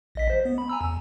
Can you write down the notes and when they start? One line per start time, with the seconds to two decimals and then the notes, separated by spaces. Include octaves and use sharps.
0.15 A#1 D#5 B6
0.30 C5
0.45 B3
0.58 B5
0.69 G#5 A#5 E6
0.81 E2